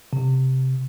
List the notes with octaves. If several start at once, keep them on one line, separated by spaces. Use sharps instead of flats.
C3